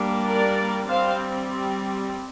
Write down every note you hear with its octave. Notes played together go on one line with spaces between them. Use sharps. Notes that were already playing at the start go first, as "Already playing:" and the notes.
Already playing: G3 A#3 D4
A#4 D5
G3 C4 C5 F5